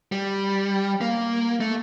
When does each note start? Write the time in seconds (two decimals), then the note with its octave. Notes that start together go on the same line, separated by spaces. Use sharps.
0.12 G3
1.01 A#3
1.61 A3